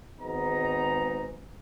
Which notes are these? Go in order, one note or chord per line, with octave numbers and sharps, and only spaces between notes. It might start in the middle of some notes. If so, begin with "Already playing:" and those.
G#1 G#2 B3 D#4 A#5